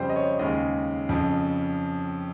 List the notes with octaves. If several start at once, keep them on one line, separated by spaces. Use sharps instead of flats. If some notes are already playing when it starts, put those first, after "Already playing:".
Already playing: F2 C#3 G3 C5 G5
D#5
C#5
D#2 C#3 G#3 D#5
F2 C#3 F3